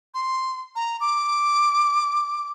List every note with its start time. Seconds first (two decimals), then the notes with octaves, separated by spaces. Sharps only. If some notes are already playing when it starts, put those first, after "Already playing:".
0.14 C6
0.76 A#5
1.00 D6